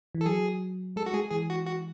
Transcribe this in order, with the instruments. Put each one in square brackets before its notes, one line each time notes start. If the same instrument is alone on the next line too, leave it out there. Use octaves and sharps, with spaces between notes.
[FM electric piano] E3
[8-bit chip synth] A4
[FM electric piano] F#3 [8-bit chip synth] G#4
[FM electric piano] G#3 [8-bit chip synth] A4
[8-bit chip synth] F#4
[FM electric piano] G#3 [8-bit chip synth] G#4
[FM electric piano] E3 [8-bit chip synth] G#4
[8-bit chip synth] F#4
F#4